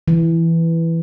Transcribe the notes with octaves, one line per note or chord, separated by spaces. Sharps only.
E3